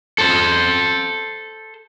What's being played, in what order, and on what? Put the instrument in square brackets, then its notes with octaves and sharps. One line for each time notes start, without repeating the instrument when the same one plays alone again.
[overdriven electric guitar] A4 C5